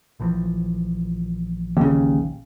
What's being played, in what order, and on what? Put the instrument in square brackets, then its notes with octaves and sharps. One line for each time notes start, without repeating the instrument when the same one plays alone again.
[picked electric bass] A#1 E3 F3
[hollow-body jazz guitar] D#2 C#3